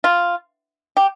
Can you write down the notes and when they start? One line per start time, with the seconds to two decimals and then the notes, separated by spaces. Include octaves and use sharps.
0.04 F4
0.97 G4